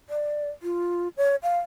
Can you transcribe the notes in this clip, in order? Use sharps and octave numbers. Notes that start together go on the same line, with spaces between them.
D5
F4
C#5
F5